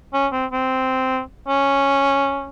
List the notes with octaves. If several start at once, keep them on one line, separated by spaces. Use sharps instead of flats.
C#4
C4
C4
C#4